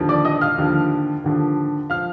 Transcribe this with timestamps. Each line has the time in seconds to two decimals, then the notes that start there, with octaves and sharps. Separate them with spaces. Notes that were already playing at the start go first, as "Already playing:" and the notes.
Already playing: D#2 D3 F3
0.09 D5 D6
0.25 D#5 D#6
0.41 F5 F6
0.58 D#2 D3 F3
1.24 D#2 D3 F3
1.90 F3 F5 F6